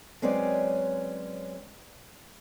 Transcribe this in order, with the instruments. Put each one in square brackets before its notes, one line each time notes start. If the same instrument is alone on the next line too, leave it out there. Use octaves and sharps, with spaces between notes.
[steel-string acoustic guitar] F#3 G#3 C4 C#4 B4 D5